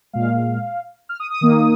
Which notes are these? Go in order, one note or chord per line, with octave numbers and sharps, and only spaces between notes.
A#2 G#3 F5
F6
D#6
D#6
D#3 A#3